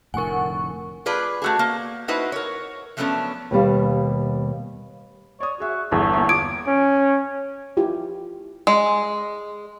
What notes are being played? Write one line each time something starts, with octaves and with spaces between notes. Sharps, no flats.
F1 A2 D3 A#4 F#5 G#5 C#6
F4 G#4 B4 D5
A3 F#4 G#4
A#3
D#4 E4 F#4 B4 C5
A#4 C#5
F3 F#3 A3 B3 C#4 D4
D#2 B2 G3 F5
C#5 D5 D#6
F#4 G#4 E5
G1 E2 A3 G#4
A#3 E4
F4 D6 D#6 G#6 D7
C#4
E4 F4 G4
G#3